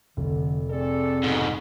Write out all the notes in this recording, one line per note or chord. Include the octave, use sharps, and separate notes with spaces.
F1 D3
C4 G#4 A4 D5
G#2 B2